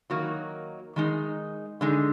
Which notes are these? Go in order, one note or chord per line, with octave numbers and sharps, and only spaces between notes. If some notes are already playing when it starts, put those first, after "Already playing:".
D#3 F#3 A#3 D#4 F#4
D#3 G#3 D#4
D3 G#3 D#4